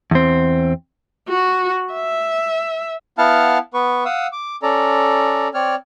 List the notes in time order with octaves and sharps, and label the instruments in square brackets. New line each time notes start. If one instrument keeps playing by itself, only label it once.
[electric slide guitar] E2 C4
[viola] F#4
E5
[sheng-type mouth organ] B3 E4 F5 F#5 A5 F6
B3 B4 C#6
F5 F#5 D#6 E6
D6
C#4 A4 D5 A#5
C4 C#5 D5 F6